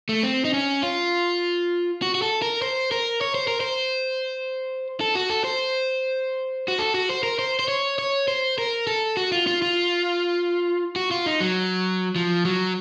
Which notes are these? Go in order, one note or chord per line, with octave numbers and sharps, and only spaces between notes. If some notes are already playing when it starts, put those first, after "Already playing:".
A3
C4
D#4
C#4
F4
F#4
F#4
A4
A#4
C5
A#4
C#5
C5
A#4
C5
A4
F#4
A4
C5
F#4
A4
F#4
C5
A#4
C5
C5
C#5
C#5
C5
A#4
A4
F#4
F4
F4
F4
F#4
F4
D#4
F#3
F3
F#3